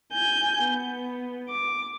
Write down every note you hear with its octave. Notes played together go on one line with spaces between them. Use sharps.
G#5 G6
B3
D6